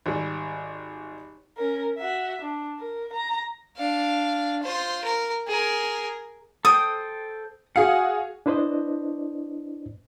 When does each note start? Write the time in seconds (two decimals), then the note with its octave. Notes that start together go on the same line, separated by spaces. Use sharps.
0.06 G#1 G3
1.57 C#4 A#4
1.98 F#4 E5
2.42 D4
2.79 A#4
3.13 A#5
3.77 D4 F5
4.63 F4 C5
5.04 A#4
5.47 G#4 A#4
6.65 A4 C5 G5 D#6
7.76 F#4 G#4 F5 F#5
8.46 D4 E4 B4 C5 D5 D#5